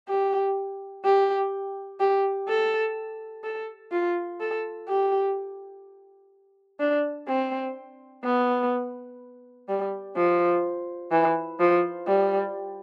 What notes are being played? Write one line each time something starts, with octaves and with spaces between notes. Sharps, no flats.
G4
G4
G4
A4
A4
F4
A4
G4
D4
C4
B3
G3
F3
E3
F3
G3